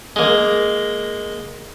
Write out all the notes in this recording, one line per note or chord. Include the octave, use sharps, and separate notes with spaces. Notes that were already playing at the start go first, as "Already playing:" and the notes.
G#3 A#3